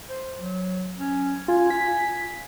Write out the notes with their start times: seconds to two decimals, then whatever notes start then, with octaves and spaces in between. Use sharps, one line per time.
0.10 C5
0.38 F#3
0.98 C#4
1.48 F4 G#5
1.70 B6